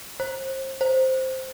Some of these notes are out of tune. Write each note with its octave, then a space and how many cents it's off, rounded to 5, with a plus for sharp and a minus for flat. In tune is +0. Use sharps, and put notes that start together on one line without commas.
C5 +30
C5 +0